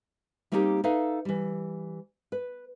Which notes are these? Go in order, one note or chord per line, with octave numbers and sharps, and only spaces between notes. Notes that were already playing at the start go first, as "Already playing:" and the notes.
G3 A#3 C4 D#4 F#4 G4
D#4 A4 B4 E5 F5
E3 G3
B4